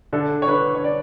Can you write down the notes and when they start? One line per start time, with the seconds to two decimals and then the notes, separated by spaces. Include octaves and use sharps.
0.13 D3 A4
0.42 C#5
0.48 D3 B4
0.75 C#5
0.84 D5